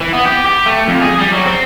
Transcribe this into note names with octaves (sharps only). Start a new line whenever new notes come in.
E3
B3
G4
G4
A3
F2
G#4
G3
F#3
C4